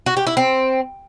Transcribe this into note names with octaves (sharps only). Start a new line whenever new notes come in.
F#4
G4
E4
C4